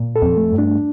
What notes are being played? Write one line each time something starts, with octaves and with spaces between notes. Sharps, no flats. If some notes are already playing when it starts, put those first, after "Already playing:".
Already playing: A#2
A4
F2
A3
G2
D4